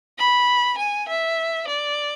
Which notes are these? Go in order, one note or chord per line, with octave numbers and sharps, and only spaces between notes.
B5
G#5
E5
D5